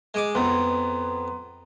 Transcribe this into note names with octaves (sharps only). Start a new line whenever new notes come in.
G#3 D6
F2 B3 B4 A#5 C6